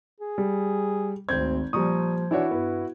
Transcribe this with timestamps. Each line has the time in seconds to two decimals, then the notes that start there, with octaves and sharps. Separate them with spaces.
0.21 G#4
0.38 G3
1.29 G#1 D2 C4 G6 G#6
1.73 A#2 F3 G3 A#5 C#6 D#6
2.31 E3 D4 E4 F#4 C#5
2.51 G2 B3